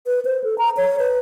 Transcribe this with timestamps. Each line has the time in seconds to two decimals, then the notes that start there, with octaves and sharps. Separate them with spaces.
0.06 B4
0.25 C5
0.44 A4
0.58 A#5
0.77 C#5
0.99 B4